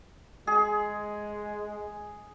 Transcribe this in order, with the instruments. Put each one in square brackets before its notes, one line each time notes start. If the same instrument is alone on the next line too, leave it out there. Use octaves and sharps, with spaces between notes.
[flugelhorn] G#3 [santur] G#4